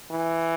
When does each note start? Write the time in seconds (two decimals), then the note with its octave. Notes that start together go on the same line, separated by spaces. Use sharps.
0.11 E3